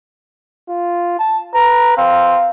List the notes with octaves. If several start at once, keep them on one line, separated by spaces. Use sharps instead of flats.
F4
A5
B4 A#5
C4 F5